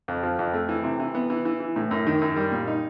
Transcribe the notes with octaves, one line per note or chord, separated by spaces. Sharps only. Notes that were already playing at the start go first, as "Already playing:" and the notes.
F2
F3
F2
A3
E3
C3
E3
B3
E3
E3
E3
A2
F#2
D#3
F#2
G3
A#2
D#4